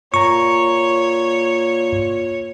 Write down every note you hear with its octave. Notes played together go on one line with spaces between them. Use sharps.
A#2 C#5 A#5 C#6